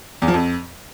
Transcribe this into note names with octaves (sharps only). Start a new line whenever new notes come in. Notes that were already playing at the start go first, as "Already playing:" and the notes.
E2
F3
F2